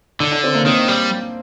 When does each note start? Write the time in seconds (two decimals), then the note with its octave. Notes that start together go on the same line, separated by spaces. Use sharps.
0.20 D3 D4
0.32 D4
0.44 C4
0.55 A#3
0.66 D#3 C4
0.88 G3